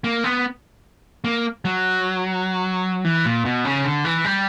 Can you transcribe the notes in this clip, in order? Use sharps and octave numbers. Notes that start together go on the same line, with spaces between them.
A#3
B3
A#3
F#3
E3
A#2
B2
C#3
D3
E3
G3